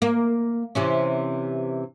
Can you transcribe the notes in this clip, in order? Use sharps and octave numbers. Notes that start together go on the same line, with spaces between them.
A#3
C3 E3 C#4